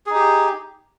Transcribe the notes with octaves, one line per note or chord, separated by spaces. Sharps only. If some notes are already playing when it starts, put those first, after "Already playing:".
D#4 G4 G#4